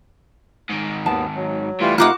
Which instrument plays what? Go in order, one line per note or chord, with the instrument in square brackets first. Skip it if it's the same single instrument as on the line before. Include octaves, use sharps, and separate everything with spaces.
[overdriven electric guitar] G#2 D#3
[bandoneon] D#2 B3 [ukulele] A5
[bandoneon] F#3
[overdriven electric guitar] A2 [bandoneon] E3 G3 F4
[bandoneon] C3 D#4 [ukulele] F4 A#4 F#5 [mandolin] F#4 D6 F#6